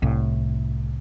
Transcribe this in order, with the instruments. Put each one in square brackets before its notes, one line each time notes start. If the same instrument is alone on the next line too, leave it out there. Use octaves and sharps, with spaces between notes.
[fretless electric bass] C2 A2